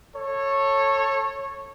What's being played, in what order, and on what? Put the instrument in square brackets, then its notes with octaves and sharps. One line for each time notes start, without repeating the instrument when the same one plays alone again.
[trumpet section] A4 C#5